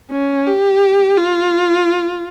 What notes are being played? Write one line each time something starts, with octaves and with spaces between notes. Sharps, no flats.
C#4
G4
F4